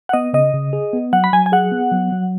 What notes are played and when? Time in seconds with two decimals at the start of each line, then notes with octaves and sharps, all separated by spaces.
0.09 F#5
0.13 B3 D#5
0.33 C#3 D#5
0.53 C#3
0.73 G#4
0.93 B3
1.13 F#3 F#5
1.24 B5
1.33 F#3 G#5
1.46 G#5
1.52 G#4 F#5
1.72 B3
1.92 F#3
2.12 F#3